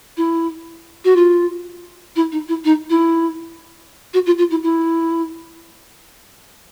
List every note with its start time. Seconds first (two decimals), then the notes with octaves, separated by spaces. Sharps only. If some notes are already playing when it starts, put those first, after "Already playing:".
0.17 E4
1.04 F#4
1.16 F4
2.15 E4
2.31 D#4
2.48 E4
2.64 D#4
2.89 E4
4.13 F#4
4.26 F4
4.38 F4
4.50 E4
4.63 E4